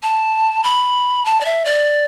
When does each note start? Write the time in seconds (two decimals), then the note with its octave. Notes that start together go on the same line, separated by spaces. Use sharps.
0.03 A5
0.64 B5
1.25 A5
1.41 D5
1.45 E5
1.65 D5